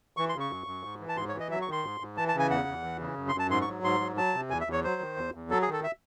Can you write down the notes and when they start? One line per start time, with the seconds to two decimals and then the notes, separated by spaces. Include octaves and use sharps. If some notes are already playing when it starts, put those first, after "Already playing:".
0.17 E3 C#6
0.29 C6
0.35 C#3
0.40 C#6
0.51 F#2
0.67 F#2
0.83 G#2
1.00 E3
1.09 A5
1.17 G#2 C6
1.29 C#5
1.34 E3
1.40 D#5
1.51 F#3 E5
1.62 C#6
1.68 D#3 C6
1.84 G#2
2.00 G#2
2.17 E3 A5
2.28 A5
2.34 C#3 G#5
2.50 E2 F#5
2.68 E2
2.84 E3
3.01 C#3
3.17 F#2
3.29 C6
3.34 F#2
3.39 A5
3.50 G#2 C6
3.62 C#6
3.68 F#3
3.83 G#2 C6
4.00 F#3
4.16 F#3 A5
4.34 C3
4.50 E2 G#5
4.61 E5
4.67 E2
4.72 C#5
4.84 F#3 C5
5.01 D#3
5.18 E2
5.34 E2
5.50 F#3 A4
5.62 G#4
5.67 D#3
5.73 A4
5.84 E5